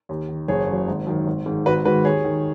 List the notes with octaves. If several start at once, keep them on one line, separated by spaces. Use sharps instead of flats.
D#2
D#3
F#1 G#4 C#5
C#3
F#2
G#1
F#2 D#3
G#1
G#2 D#3
G#1 F#4 B4
G#2 D#3 F#4 B4
D#2 G#4 C#5
D#3